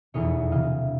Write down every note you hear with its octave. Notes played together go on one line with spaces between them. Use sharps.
F1 E2 B2 C#5 D#5
E1 D2 C3 E3 D#5 F5